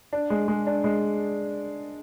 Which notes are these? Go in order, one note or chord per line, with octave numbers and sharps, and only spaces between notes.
D4
G#3
G#3
D4
G#3